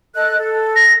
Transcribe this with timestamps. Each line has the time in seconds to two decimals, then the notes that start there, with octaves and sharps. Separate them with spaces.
0.15 A4 D#5 F#6
0.37 A4
0.76 A#6